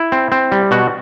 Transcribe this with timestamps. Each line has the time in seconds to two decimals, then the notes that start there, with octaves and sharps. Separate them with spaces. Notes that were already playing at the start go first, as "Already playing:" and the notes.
Already playing: E4
0.12 C4
0.32 C4
0.52 G3
0.71 B2 F#4